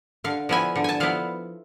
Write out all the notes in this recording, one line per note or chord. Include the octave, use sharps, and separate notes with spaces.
D3 F5
F3 B3 E4 G#5
D3
G#5 A5
F3 B3 E4 F5